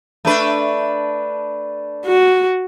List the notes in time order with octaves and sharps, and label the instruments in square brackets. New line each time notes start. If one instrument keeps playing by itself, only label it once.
[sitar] A3 D4 B4
[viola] F#4